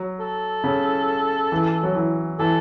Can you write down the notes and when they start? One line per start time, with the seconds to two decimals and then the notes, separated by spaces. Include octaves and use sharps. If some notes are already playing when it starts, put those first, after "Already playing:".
Already playing: F#3
0.20 A4
0.64 C#3
1.52 E3
1.83 F#3
1.95 E3
2.39 E3 A4